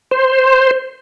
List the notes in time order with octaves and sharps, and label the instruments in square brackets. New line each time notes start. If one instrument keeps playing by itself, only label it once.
[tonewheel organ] C5